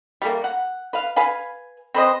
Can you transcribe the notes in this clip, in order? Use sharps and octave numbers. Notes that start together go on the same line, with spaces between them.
G3 A3 A#3
F#5
B4 F5
B4 F5 G#5
C4 B4 C5 D#5